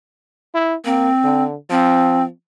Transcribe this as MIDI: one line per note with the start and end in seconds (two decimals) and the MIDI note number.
0.54 0.75 64
0.85 1.10 58
0.85 1.44 60
1.24 1.55 50
1.70 2.29 53
1.70 2.24 60